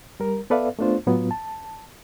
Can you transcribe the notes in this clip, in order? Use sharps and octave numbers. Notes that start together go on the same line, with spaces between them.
G3 A#4
B3 A4 B4 D5 E5 F5
A3 B3 D4 F4 C5
A2 F#3 B3 F4
A5